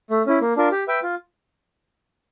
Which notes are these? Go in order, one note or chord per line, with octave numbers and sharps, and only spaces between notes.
A3
C#4 E4
A#3
D4 F4 A#4
G4
B4 E5 G5
F4